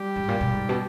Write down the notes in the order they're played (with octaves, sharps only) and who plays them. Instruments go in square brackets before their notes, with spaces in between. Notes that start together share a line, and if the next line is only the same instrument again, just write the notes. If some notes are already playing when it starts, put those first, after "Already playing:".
Already playing: [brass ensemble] G3 G4
[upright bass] G#2
A#2
B2
G#2
B2